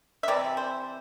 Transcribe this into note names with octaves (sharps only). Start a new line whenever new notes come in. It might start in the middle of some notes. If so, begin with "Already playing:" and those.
E5
C3 E3 D5
C5